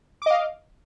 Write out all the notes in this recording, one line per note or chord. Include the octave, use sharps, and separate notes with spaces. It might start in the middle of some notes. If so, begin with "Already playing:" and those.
D#5 F5 D6